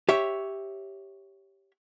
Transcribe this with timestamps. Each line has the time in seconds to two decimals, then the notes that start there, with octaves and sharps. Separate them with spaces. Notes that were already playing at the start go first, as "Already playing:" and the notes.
0.09 G4 C#5 E5